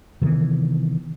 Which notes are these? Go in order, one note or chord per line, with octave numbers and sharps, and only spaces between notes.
C3 D#3 E3 B3